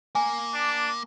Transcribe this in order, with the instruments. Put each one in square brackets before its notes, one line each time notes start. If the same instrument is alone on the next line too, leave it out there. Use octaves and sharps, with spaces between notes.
[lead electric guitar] A#3 [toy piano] G#5
[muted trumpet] D4